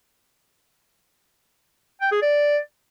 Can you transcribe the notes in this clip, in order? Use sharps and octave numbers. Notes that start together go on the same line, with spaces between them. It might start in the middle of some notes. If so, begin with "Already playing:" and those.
G5
G#4
D5